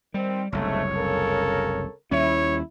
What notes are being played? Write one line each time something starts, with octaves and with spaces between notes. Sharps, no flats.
D#3 G3 C4
F#1 C2 G#2 A3 C#5
C#3 A4 A#4
D#2 G3 C#4 E4 C#5